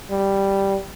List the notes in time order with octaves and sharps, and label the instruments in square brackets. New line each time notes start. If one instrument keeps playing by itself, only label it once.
[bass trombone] G3